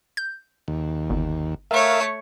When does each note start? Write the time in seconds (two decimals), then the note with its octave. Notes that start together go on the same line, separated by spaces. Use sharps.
0.17 G6
0.68 D#2
1.10 G1
1.71 A3 A#4 C#5 E5 F5